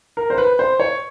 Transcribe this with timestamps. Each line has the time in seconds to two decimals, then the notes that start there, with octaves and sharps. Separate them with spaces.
0.17 A#4
0.30 C5
0.38 B4
0.59 C5
0.80 C#5